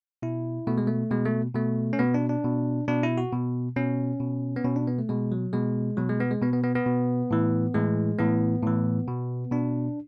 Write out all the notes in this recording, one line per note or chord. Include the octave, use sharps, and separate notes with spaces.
B2 E4
B2 A3
G#3
A3
B2 G#3
A3
B2 A3
C#4
B2 B3
D4
D4
B2
B2 D4
E4
F#4
B2
B2 C#4
B2
B3
B2 C#4
D4
B3
A3
B2 G#3
F#3
B2 G#3
B2 F#3
G#3
B3
G#3
B2 B3
B3
B3
B3
B2
A2 E3
A2 E3 G#3
A2 E3 B3
A2 E3
B2
B2 D4